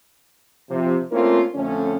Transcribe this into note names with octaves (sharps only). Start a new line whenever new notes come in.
C3 F3
A3 A#3 C4 C#4 F4 A#4
F2 D3 A3 C#4